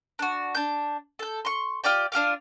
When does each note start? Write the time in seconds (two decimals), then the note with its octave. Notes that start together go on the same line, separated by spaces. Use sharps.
0.19 D4 F#4
0.55 D4 G6
1.19 A4 G6
1.45 C6 C#6
1.84 F4 G4 D5 G5
2.12 D4 F4 G4 F5